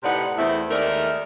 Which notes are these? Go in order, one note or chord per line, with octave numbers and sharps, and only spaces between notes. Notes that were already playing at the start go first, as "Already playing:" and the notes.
A2 C3 D#4 B4 D5 F#5
E2 A3 C4 E4
D#2 D#3 G#3 A3 A#4 D5